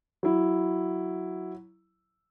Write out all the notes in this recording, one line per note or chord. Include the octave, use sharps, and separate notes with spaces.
F#3 E4